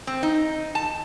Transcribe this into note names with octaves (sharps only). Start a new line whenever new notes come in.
C4
D#4
A5